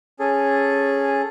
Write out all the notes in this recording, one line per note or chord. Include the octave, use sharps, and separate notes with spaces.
C#4 G#4 A4